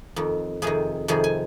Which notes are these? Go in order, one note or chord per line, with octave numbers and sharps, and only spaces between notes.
F2 D#3
F2 C3 D#3 G#4
F2 C3 D#3 G#4
G#5